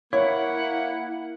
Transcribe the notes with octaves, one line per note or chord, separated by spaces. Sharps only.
A#3 E4 C#5 F#5